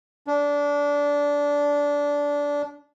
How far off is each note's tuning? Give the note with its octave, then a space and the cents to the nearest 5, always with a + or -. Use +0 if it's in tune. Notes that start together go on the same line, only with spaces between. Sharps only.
D4 -20